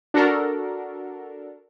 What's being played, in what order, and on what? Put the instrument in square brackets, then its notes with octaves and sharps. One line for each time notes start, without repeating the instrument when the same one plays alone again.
[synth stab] D4 F#4 A4 A#4